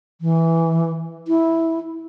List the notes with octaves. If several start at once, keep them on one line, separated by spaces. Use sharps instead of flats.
E3
E4